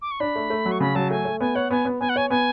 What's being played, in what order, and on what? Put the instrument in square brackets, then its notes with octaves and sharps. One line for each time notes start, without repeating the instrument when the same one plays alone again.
[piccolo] D6
C#6
[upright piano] D4 [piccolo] B5
[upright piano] A3
A3
F#3
[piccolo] C#6
[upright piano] C#3 [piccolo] B5
[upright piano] F#3 [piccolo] A5
[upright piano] A3 [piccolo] G#5
[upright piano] A3
[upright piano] B3 [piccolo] G#5
[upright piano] C#5 [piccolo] F#5
[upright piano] B3 [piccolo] G#5
[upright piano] B3
[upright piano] B3 [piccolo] G#5
[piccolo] F#5
[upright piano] C#5 [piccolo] G#5
[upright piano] B3 [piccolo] G#5